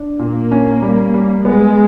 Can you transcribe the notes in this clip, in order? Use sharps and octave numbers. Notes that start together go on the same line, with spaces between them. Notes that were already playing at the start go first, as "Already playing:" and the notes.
Already playing: D4
A#2 A#3
C#4
G3
G3
G#3 B3